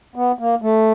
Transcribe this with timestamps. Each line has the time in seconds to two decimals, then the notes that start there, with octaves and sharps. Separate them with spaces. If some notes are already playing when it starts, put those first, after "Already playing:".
0.16 B3
0.39 A#3
0.62 A3